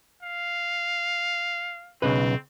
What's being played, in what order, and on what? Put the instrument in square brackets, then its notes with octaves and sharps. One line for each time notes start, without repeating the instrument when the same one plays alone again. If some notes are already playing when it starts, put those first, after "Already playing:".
[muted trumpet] F5
[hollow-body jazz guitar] B1 C#3 B4 [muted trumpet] C4